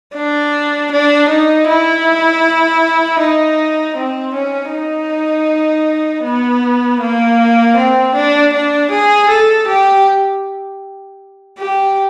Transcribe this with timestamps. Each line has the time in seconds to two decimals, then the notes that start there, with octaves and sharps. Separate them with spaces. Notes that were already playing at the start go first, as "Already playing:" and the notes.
0.16 D4
0.92 D4
1.29 D#4
1.68 E4
3.20 D#4
3.97 C4
4.34 C#4
4.72 D#4
6.24 B3
7.01 A#3
7.77 C4
8.15 D4
8.53 D4
8.91 G#4
9.29 A4
9.68 G4
11.59 G4